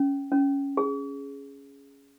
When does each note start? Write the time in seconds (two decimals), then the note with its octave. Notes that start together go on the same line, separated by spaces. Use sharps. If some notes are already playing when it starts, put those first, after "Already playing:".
Already playing: C#4
0.32 C#4
0.77 G#4